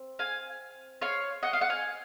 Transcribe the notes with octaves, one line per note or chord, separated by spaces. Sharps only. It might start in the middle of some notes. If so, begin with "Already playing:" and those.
Already playing: C4
F5 G#5
C#5 F5
D#5 F#5
F5
F#5
F5 G#5